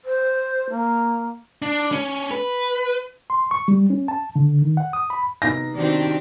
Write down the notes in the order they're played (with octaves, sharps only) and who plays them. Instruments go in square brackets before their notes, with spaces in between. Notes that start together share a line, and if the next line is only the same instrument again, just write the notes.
[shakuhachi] C5
A#3
[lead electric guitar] D4
C#4
B4
[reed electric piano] C6
C#6
G3
C#4
A5
D3
D#3
F#5
D#6
B5
[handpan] C3 B3 D#4 [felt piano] A#6
[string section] D#3 C4 [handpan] B3 F#4 [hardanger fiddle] D4 G4